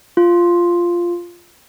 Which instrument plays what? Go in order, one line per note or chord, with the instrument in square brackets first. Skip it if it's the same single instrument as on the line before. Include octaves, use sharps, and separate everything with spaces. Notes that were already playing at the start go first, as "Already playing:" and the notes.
[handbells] F4